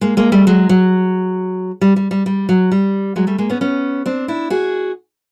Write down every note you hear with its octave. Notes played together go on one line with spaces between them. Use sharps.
G#3 A#3
G#3 A#3
G3 A3
F#3 G#3
F#3
G3
G3
G3
G3
F#3
G3
F#3 G#3
G3 A3
G#3 A#3
B3 C#4
B3 C#4
C4 D4
D4 E4
F#4 G#4